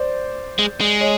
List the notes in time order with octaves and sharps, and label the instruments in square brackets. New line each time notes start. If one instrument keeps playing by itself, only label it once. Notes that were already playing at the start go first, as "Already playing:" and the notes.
Already playing: [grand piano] C5 D5
[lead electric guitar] G#3
G#3
[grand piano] C#5 D#5